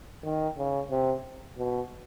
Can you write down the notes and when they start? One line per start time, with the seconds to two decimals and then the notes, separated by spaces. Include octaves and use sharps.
0.25 D#3
0.58 C#3
0.91 C3
1.58 B2